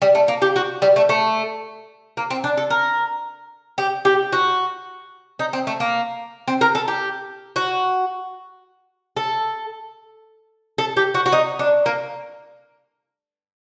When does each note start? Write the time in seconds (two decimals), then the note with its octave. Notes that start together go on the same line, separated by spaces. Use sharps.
0.02 G3
0.15 A3
0.28 A#3
0.42 G4
0.56 F#4
0.82 G3
0.96 A3
1.09 A3
2.17 A#3
2.30 C4
2.44 D4
2.57 A4
2.70 A#4
3.78 G4
4.05 G4
4.32 F#4
5.39 D#4
5.53 C4
5.67 A3
5.80 A#3
6.48 C4
6.61 A#4
6.75 A4
6.88 G4
7.56 F#4
9.17 A4
10.78 A4
10.97 G4
11.14 F#4
11.26 F#4
11.32 D#4
11.59 D4
11.86 A#3